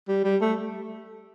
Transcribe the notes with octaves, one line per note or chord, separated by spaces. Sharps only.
G3
G3
A3